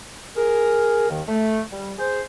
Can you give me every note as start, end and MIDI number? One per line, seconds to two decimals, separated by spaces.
0.37 1.08 68
0.37 1.08 70
1.10 1.22 39
1.10 1.22 51
1.28 1.61 57
1.71 1.93 55
1.98 2.22 68
1.98 2.22 72